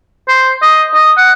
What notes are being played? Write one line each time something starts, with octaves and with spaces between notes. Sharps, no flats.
C5
D#5
D#5
F#5